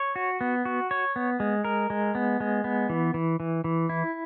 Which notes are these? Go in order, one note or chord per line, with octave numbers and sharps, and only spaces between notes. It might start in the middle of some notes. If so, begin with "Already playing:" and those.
Already playing: C#5
F#4
B3
F#4
C#5
B3
G#3
A#4
G#3
B3
G#3
B3
E3
E3
E3
E3
E4